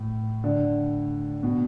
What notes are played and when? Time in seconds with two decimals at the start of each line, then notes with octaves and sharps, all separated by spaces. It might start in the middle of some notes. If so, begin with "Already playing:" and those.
Already playing: A2
0.44 D3
1.43 B2